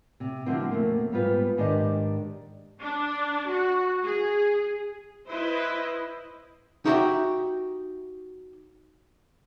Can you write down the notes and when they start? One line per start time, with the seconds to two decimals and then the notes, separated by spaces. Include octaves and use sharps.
0.20 C3
0.46 D3 F3 F#3 G#3 C4 E4
0.70 F2 B2 A3 A#3 C#4
1.12 G#2 G3 B3 F4 B4
1.57 G#2 D#3 D4 G4 D5 D#5
2.81 D4
3.49 F#4
4.04 G#4
5.29 E4 B4 C5 D#5
6.85 D#4 E4 F#4 G4 E5 G5